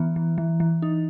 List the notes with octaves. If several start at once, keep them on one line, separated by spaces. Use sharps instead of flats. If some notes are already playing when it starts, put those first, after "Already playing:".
Already playing: E3 B3
E3
E3
E3
D#4